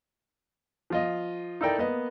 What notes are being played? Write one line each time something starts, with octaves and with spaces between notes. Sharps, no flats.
F3 F4 D#5
D#4 E4 A4 A#4 D5 G5
A#3 B3 D#5